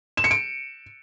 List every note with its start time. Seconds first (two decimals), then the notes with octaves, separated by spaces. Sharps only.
0.17 E7
0.24 C#7
0.31 D7